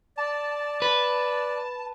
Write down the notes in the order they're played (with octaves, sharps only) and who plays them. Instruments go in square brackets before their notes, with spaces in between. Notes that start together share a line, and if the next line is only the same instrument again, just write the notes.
[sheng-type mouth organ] D5 [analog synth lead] A5
[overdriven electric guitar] B4